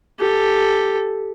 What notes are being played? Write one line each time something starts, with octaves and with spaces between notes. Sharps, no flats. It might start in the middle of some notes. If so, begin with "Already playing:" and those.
G4 A4